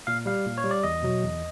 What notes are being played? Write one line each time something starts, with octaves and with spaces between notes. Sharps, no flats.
A#2 F5
G3 F5
A#2
C#5
G3
D5
E2 D#5
B2 F#3
E2